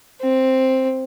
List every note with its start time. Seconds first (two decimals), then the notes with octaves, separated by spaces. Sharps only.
0.21 C4